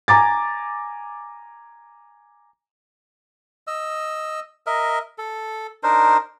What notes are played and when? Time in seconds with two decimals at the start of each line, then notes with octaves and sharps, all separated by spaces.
0.08 G#5 A#5 D6 A6
3.67 D#5 E6
4.66 A#4 D#5 E5
5.18 A4
5.83 D4 D#4 A#4 C5